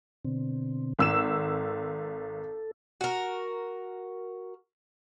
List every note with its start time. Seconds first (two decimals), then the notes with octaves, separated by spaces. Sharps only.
0.25 B2 D3 C4
0.99 G#1 A4 E6 E7
3.01 F#4 A#4